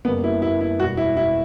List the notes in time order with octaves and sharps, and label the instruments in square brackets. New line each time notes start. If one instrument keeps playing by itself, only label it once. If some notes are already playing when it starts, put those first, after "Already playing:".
[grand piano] F#1 F#2 C#3 G3 A#3 [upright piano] B3
[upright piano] E4
E4
E4
[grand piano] E1 E2 B2 G3 [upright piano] F#4
[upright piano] E4
E4